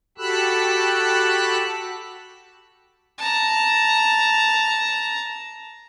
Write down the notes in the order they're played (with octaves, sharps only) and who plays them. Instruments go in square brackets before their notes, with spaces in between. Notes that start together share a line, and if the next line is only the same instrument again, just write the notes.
[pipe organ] F#4 G4 A4 B5 E6 F#6
[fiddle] A5 A#5